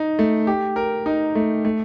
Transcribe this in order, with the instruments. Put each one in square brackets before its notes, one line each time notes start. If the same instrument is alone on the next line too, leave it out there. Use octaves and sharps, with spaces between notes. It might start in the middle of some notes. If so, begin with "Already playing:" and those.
Already playing: [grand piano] D#4
A3
G4
A#4
D#4
A3
A3